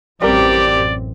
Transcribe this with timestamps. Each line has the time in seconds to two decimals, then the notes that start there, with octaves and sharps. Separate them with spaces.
0.22 A1 F#2 G3 C4 G4 A#4 D5